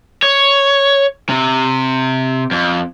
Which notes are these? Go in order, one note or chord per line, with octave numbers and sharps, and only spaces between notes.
C#5
C3
F2